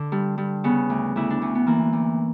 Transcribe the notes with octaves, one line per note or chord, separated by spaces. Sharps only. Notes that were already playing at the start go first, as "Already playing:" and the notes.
Already playing: D3
G2
G2
C#3 B3
D2
D2 E4
D4
D2 C#4
B3
E3 A#3
D2